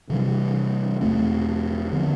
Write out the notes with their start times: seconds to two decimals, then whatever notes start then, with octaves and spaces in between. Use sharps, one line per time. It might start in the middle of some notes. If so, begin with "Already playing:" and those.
0.10 C3 E3 G3
1.01 E2 B2 A3 C4
1.92 D3 F3 B3